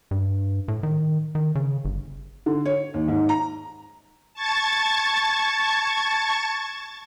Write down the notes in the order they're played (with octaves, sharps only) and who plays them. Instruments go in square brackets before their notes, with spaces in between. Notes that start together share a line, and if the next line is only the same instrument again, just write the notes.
[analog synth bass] G2
A2
D#3
D#3
C#3
G1
[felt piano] D3
C#5
D#2
G#2
A#5
[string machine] A5 C#6 G#6 A6